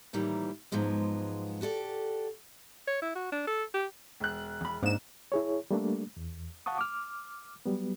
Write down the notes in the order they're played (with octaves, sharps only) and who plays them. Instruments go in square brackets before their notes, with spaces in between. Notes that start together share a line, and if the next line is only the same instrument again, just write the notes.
[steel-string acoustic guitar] A2 D#3 E3 G3 A#3
G#2 F3 F#3 G#3 B3
F#4 G4 A4 D5
[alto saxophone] C#5
E4
F#4
D4
A4
G4
[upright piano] E1 F#6
[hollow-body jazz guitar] E2 B5
[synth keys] G#2 E7 [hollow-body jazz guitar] A#3 D4 D#4
[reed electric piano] E4 G#4 C#5
G3 A3 A#3 D4
E2
F5 F#5 A5 C#6 D#6
D6 F6
F#3 G3 B3